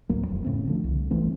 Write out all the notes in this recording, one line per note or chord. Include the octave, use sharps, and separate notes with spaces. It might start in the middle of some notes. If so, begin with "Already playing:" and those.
A1 D2 F#3 A#3
D#1 F2
A2 C#3 A3 C4
D3 F3 A3
C2
G1 E3 A3 C4